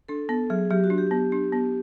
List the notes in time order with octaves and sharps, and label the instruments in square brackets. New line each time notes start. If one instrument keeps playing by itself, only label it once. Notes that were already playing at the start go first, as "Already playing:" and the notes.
[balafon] D4 [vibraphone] A4
[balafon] B3 [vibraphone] A4
[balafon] F#3 [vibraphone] G#4
[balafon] F#3 [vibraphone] G4
[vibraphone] F#4
[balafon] D4
[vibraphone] G4
[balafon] B3
D4
B3